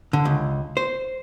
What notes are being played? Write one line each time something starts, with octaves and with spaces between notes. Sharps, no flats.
D3
C#2
C5